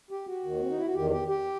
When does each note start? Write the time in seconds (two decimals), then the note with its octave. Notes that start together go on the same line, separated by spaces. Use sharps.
0.11 G4
0.27 F#4
0.44 D#2 D#3
0.60 C4
0.69 D#4
0.77 E4
0.86 F#4
0.94 E2 D#3 G4
1.10 G4
1.28 G4